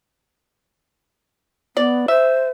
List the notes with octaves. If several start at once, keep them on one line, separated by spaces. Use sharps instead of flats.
B3 D5
C5 E5